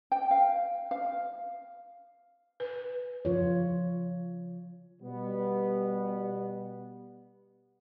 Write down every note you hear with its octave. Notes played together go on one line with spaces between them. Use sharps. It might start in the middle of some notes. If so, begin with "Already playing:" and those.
G5
F5
F5
B4
C#3 F3 F4 C#5
B2 G3 B3